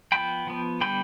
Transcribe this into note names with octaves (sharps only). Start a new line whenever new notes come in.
F3 B3 G5 B5
F3 B3
D3 G3 B3 G5 B5